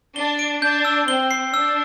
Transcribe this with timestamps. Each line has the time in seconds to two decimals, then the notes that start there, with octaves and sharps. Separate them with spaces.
0.16 D4 G7
0.39 D7
0.62 D4 G6
0.85 E6
1.07 C4 G7
1.31 C7
1.54 D4 E6